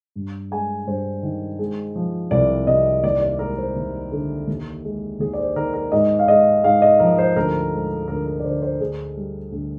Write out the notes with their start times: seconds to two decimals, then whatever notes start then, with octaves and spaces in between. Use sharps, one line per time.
0.16 G2
0.51 G#3 G#5
0.87 G2 C5
1.23 D#3
1.59 G#3
1.96 F3
2.31 C2 D5
2.67 C3 D#5
3.03 D#2 D5
3.22 D5
3.39 G#3 A#4
3.58 C5
3.76 D#2
4.12 D3
4.47 D#2
4.85 G#3
5.20 D#2 G#4
5.33 D5
5.39 C5
5.56 D#3 A#4
5.74 A#4
5.92 G#2 D#5
6.19 F5
6.28 G#3 D#5
6.64 G#2 F5
6.82 D#5
7.00 F3 A#4
7.18 C5
7.36 D2 A#4
7.73 G#3
8.08 D2 A#4
8.26 A#4
8.39 D5
8.44 D3 C5
8.62 C5
8.81 D2 G#4
9.17 G3
9.52 D2